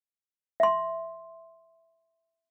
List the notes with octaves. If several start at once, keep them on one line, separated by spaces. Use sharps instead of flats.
E5 C6